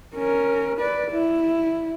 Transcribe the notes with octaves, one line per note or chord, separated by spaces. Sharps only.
C#4 A#4
B4 D5
E4